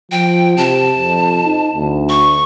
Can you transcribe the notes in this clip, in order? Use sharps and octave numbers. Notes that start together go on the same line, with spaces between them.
F3 G5
C3 A5
F2
D#4
D2
C#6